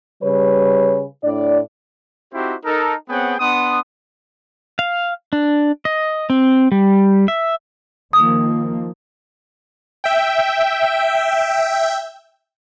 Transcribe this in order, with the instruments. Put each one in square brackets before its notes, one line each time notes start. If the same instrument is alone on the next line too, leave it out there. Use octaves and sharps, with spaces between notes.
[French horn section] C#3 G3 B4 C#5
A2 D4 D5
[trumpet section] C4 D#4 E4 F#4 G4 C5
D#4 A4 A#4
B3 C4 G#4 C#5 F#5 G5
B3 D4 F#5 C6 D#6
[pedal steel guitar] F5
D4
D#5
C4
G3
E5
[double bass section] D#3 F3 A#3 [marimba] D#6
[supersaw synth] E5 G5